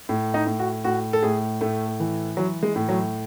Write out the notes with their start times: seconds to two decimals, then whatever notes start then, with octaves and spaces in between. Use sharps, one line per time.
0.09 A2
0.34 D#4
0.47 A2
0.59 F#4
0.84 A2 F#4
1.13 A4
1.23 A2 G#4
1.61 A2 A3
2.00 E3
2.37 E3 F#3
2.63 G#3
2.76 A2
2.89 F#3